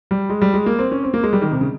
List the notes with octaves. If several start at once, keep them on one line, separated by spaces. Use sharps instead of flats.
G3
G#3
G3
G#3
A#3
C4
C#4
C4
A#3
G#3
G3
D#3
C3
C#3